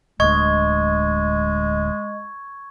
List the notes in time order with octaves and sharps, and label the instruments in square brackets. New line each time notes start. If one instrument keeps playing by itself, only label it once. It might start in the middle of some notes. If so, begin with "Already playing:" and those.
[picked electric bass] D1 D2 [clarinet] G#3 [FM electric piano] D#5 [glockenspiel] C#6 G#6